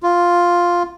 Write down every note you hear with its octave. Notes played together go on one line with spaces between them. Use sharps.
F4